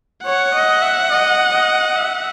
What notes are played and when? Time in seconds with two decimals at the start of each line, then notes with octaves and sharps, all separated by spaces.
0.25 C#5 F#5
0.54 D#5
0.82 E5
1.10 D#5
1.53 D#5
1.95 E5